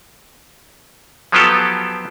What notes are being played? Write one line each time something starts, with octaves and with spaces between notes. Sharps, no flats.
F3 F#3 B3 F4 G4 A4